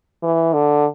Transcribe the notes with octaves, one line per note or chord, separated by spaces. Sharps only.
E3
D3